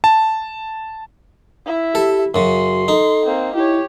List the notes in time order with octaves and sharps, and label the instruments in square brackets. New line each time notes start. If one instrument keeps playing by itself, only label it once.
[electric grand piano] A5
[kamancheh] E4 E5
[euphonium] G4 [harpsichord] A4
[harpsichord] F#2 C#3 [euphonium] F#4 [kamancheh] C6
[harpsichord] D#4 [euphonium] A4
[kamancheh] A#3 C4
[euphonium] E4 [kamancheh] G4 C#5